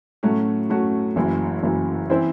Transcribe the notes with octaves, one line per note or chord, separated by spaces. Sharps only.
A2 F#3 A3 C#4 F#4
A2 F#3 A3 C#4 F#4
F#1 F#2 E3
F#1 F#2 E3
E3 C4 E4 C5